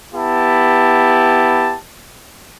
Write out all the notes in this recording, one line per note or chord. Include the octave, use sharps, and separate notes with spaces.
B3 E4 G4 A5